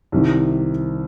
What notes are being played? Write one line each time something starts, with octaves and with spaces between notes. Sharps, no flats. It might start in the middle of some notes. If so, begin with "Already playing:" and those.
C2 C3 D#3